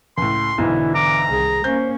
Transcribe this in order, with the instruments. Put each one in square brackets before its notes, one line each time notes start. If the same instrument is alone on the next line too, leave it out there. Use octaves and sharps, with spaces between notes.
[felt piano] C#2 A2 [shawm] C6
[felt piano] B1 G#2 [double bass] D3 E3 [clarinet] E4
[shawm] A#5 [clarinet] D6
[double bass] C2 D#3 [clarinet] G#4
[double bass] A#3 C#4 [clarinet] C5 [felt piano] G6